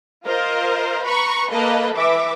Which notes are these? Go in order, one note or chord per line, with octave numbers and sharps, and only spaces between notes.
F4 A#4 C5 D#5
B4 A#5 B5 C#6
A#3 A4 B4 D#5
E3 E5 D6